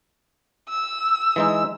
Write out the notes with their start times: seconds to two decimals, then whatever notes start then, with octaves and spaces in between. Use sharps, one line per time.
0.69 E6
1.36 E3 G#3 D#4